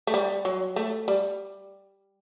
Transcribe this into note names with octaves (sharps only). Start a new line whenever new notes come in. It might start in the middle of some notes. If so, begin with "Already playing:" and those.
A3
G3
F#3
A3
G3